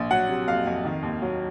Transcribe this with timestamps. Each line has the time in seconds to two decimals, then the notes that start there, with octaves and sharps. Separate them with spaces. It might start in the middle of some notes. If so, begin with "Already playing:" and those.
Already playing: A#1
0.11 F#3 F#5
0.29 C3
0.48 F2 F5
0.66 F2
0.85 D#3
1.03 D#2
1.22 F#3